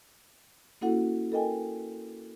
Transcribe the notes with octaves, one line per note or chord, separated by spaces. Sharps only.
A#3 C#4 E4 F#4 A4 F#5
A4 A#4 D#5 G5 G#5